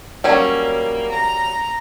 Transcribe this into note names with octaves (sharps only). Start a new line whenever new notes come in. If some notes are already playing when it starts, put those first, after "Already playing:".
F#3 G3 A#3 C#4
A#5